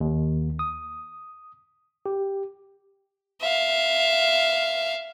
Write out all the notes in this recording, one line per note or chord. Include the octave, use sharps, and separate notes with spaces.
D#2
D#6
G4
E5 F5